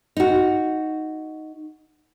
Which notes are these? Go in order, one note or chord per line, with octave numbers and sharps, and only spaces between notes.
D#4 F#4